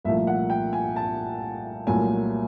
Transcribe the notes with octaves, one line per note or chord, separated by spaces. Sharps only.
C2 A#2 F3 A3 E5
F#5
G5
G#5
A5
C2 A#2 F#3 A3 G#5